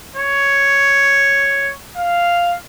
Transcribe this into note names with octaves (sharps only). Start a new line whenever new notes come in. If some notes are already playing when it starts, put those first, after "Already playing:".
C#5
F5